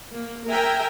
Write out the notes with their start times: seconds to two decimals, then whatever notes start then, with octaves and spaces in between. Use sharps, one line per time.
0.14 A#3
0.47 A#4 E5 G5 G#5 A#5